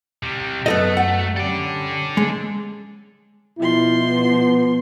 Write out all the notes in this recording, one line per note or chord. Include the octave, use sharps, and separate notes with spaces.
C3 G3
F#2 A3 B3 A4 D#5
F#5
G3 C#4 A4 D5
G#3
B2 F3 E4 C6
B3